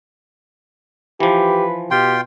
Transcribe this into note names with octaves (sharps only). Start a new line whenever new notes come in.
E3 F3 G4 B4
B2 F4 G4 G5 C6